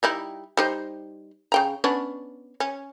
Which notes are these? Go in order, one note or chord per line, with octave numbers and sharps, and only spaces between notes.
G3 D#4 E4
G3 D#4 C5
C#3 G5 A#5
B3 C#4 D4
C#4